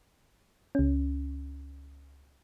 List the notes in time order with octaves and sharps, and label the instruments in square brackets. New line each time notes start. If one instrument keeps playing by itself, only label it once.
[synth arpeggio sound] C#2 C#4